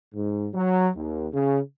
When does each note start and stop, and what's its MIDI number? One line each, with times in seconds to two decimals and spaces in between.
0.14 0.48 44
0.54 0.89 54
0.96 1.27 39
1.33 1.59 49